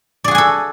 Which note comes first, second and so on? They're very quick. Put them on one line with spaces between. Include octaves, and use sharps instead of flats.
D5 G#4 F#4 G#5 A4